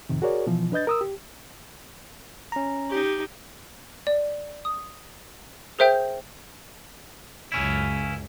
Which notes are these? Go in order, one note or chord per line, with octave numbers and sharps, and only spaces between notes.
F2 A2 C3 D#3
F#4 G#4 A#4 C#5 D5
B2 E3 F3
D4 B4 D#5 G6 A6
A#4 D#6 E6
G4
C#4 A#5
D#4 G4
D5
D#6
G#4 A#4 C5 E5 G5 G6
C#2 F#2 C#3 C#4 E4